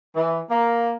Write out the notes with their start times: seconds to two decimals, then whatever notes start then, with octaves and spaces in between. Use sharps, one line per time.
0.16 E3
0.50 A#3